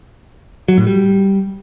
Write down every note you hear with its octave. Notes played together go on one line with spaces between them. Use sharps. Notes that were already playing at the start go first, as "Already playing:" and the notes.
F#3
A2
G3